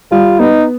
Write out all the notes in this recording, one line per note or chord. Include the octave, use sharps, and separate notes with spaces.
G3 F4
B3 D#4